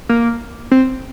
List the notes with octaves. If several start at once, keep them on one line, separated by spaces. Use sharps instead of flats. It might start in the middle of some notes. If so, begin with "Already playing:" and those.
A#3
C4